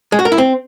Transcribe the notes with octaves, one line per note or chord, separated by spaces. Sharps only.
G#3
F#4
A#4
E4
C4